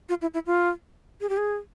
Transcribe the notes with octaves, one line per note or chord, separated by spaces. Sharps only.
F4
E4
E4
F4
G#4
G4
G#4